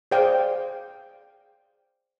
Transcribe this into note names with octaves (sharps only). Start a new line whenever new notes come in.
G#4 C5 D5 F5 G5